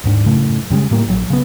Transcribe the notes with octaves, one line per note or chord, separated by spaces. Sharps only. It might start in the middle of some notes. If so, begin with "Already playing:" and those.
D#1 G#2 C4 D4
F#2 A2 C#3 A3
F#2 C#3 G3 G#3
A2 G3 A#3
A#1 F#3
C#3 B3